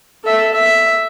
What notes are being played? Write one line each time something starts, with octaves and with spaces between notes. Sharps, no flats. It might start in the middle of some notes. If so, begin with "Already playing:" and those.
A4 E5
E5